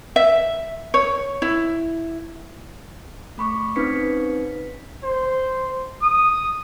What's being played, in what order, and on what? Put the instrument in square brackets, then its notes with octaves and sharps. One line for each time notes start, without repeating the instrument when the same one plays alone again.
[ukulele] E5
C#5
E4
[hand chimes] A3 B5 C#6 D6
C4 C#4 D#4 B4 B6 C#7
[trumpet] C5
D#6